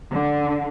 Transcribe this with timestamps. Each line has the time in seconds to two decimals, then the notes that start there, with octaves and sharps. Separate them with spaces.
0.13 D3